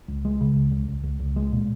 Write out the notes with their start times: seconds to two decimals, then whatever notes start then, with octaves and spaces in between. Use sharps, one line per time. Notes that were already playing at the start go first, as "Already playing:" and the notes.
0.08 C#2
0.25 G#3
0.41 C#3
0.56 C#2
0.71 C#2
0.88 C#2
1.04 C#2
1.20 C#2
1.36 G#3
1.52 A#2